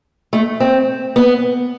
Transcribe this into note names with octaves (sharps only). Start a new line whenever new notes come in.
A3
C4
B3